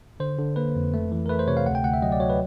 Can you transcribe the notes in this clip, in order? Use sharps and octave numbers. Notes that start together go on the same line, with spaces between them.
D3 C5
D3
A#3 B4
F2
A3
E3
A#4
A3 B4
C5
C3 C#5
F5
D2 F#5
G5
D2 F#5
E5
F#3 D#5
D5
F#3 C#5
B4